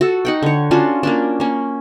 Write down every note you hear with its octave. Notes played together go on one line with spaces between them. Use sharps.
F#4 A4
D#4 F#5 G5
D3 C#5
C#4 D4 F4 F#4
A#3 C#4 D4
A#3 C#4